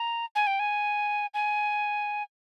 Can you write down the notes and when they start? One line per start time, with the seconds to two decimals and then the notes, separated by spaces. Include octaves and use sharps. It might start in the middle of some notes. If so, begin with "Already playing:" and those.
Already playing: A#5
0.35 G#5
0.47 G5
0.59 G#5
1.34 G#5